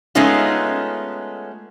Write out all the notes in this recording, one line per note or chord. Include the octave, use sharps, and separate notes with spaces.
G#3 A3 B3 C#4 D#4 F4